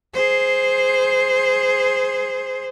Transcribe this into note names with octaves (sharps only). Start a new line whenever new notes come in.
G#4 C5